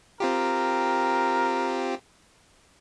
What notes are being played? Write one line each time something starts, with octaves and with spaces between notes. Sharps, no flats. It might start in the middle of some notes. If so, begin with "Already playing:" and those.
C4 F4 G4 A#4